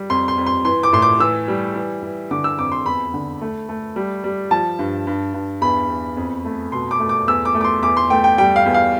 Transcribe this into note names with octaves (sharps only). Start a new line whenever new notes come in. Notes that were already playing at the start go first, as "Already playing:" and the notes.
Already playing: G3
F2 C6
C6
F2
C6
E3 C6
D6
A2 C6
D6
E3 E6
G3
E3
E3
D3 D6
E6
F2 D6
C6
E2 B5
D3
A3
A3
G3
G3
F3 A5
G2
G2
G2
E2 B5
E2
F2
A3
B2 C6
D6
A3
D6
E2 E6
D6
A3
D6
C6
E2 D6
C6
A3 G5
G5
G3 G5
F5
E2
F5